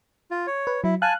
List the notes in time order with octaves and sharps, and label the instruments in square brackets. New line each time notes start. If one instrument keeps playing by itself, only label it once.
[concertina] F4
C#5
[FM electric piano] B4
[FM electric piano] F#3 [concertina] E4
[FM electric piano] F5 F#6 [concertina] G#5 A5